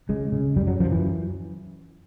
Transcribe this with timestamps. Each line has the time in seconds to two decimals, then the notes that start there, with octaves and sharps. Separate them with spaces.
0.09 C#3 G#3
0.32 C#3
0.56 F#2 G3
0.67 F#3
0.79 F#2 F3
0.91 E3